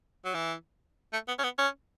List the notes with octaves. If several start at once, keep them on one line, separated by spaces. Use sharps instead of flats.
F#3
E3
A3
B3
C#4
B3
C#4